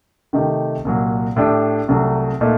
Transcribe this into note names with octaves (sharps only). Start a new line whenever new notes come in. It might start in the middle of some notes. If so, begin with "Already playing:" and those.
C3 D#3 A3 D#4 G4
C2 A#2 F#3
A2 A3 D4 G4
C2 C3 F#3 A3
A#2 A3 D#4